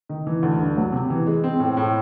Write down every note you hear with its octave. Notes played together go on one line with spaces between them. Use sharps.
D#3
E3
D2
G2
F#3
C3
E3
G#3
C4
A2
A2